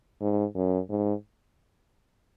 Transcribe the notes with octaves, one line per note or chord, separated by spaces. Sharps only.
G#2
F#2
G#2